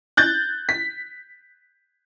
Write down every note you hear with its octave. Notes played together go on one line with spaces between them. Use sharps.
F#6 G6 A6
B6